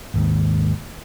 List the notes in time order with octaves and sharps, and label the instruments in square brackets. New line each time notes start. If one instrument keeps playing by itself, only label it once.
[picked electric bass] G#1 D#2 G#2